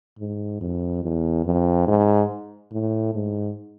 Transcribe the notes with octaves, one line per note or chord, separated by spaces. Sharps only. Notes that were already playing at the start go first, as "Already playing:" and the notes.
G#2
F2
E2
F2
G#2
A2
G#2